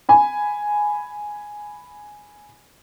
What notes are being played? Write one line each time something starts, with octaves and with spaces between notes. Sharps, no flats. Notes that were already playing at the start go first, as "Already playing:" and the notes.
G#5 B5